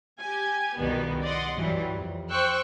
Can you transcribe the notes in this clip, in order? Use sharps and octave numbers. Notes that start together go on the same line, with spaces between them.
G4 G#5
C2 F2 B2 D#3 G3 B3
D5 D#5 F#5 C6
G2 E3 F#3 G3
F2
C5 G5 C#6 E6 F#6